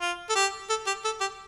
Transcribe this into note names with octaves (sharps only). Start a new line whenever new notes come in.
F4
A4
G4
A4
G4
A4
G4